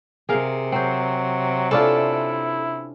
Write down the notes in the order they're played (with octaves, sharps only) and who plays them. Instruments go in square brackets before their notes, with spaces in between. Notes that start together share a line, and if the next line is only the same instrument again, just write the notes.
[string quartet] C3 [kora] G#4 A#4 F5
[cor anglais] F#3 [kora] C4 C5
[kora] C#4 D4 F4 [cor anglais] E4 [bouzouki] A4